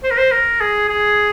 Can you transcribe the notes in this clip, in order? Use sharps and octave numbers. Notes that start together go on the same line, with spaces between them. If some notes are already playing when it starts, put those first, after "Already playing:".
C5
A#4
C5
A#4
G#4
G#4